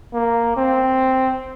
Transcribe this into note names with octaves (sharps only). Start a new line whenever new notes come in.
A#3
C4